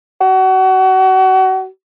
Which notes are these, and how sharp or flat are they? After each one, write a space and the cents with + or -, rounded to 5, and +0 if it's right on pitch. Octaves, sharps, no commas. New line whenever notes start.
F#4 +30